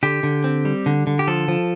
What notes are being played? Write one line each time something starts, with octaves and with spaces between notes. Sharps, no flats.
D3 G4
D3
C4
G3
D3
D3
G4
F3 A4
F3